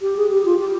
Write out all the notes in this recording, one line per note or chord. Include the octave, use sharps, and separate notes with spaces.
G4
G#4
G4
F4
G4